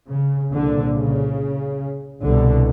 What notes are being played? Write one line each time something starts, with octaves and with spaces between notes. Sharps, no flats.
C#3
C2 A#2 D3
C#3
C2 B2 D3